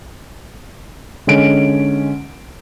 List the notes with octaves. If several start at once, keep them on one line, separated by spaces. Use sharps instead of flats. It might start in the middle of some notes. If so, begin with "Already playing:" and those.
D3 G#3 C#4 D7